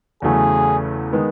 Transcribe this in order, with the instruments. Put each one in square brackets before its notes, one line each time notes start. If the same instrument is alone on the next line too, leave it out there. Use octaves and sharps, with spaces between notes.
[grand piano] E2 C#3 F#3 A3 [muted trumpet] G#4
[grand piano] D#3 G#3 B3